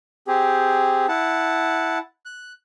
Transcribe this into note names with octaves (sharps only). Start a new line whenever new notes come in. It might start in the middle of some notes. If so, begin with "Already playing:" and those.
C4 G4 G#4
E4 F#5 A5
F#6